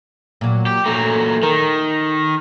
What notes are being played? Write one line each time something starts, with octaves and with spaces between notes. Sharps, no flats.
A#2 F#3
G4
A#2 F#3 A3
D#3 A#4